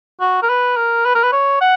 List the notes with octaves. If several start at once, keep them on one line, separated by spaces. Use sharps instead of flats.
F#4
A#4
B4
A#4
B4
A#4
B4
C#5
F#5